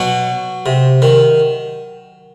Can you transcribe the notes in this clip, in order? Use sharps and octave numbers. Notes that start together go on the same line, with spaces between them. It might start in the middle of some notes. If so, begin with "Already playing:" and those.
Already playing: B2 F#3 F#4
C3
D#3